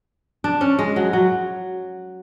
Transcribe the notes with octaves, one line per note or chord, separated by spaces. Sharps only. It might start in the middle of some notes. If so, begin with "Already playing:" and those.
D4
C#4
G#3
F#3
F#3